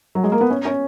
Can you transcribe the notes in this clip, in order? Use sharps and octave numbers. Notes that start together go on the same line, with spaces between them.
F#3
G#3
A#3
B3
C#4
C#4